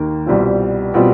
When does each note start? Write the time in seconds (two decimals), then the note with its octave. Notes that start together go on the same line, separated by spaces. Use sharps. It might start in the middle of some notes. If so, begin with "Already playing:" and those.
Already playing: D#2 D#3 A#3
0.26 C2 B2 G3 C4 F4
0.94 B2 G3 C4 F4